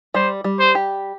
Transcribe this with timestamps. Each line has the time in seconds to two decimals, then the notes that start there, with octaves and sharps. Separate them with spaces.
0.14 G3 C5
0.44 G3
0.60 C5
0.75 G4